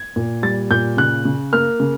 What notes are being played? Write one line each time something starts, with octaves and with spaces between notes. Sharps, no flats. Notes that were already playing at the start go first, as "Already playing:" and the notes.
Already playing: G#6
A#2
G3 A6
A#2 G6
C#3 F#6
C#3
A#3 F6
C#3